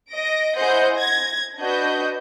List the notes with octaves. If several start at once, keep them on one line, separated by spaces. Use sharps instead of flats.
D#5 A#6 D7
E4 G#4 C5 D#5 F#5 G6
G#6 A#6
D4 F#4 B4 D#5 G6